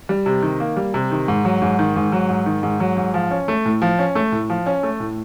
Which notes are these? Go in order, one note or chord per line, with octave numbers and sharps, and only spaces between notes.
G3
C3
D#3
A#3
G3
C3
D#3
G#2
F#3
G#2
D#3
G#2
F#3
G#2
D#3
G#2
F#3
G#2
F3
C#4
A3
A2
F3
C#4
A3
A2
F3
C#4
A3
A2